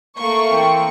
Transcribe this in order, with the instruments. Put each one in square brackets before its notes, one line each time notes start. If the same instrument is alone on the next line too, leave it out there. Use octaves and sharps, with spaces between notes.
[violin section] A3 A#3 C#6
[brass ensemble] E3 C4 G5